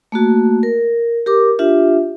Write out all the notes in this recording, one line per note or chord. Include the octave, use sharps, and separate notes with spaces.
A3 A#3 F#4
A#4
G4 A#4 D6
D4 F4 G4 E5